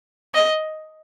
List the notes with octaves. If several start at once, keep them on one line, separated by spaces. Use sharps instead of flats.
D#5